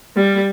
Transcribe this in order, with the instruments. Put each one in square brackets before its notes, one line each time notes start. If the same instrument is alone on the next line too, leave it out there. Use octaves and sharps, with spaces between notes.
[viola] G3